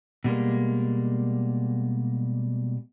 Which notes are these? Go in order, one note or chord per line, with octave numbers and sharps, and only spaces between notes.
B2 G3 G#3 A#3